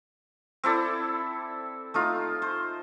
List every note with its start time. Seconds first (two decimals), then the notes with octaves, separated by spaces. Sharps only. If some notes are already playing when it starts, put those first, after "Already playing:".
0.64 C4 E4 A4 D5
1.94 A3 D#4 F4
2.42 C5